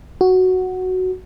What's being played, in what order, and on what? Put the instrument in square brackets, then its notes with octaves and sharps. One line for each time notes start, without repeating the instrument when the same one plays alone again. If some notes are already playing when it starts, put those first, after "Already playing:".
[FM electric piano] F#4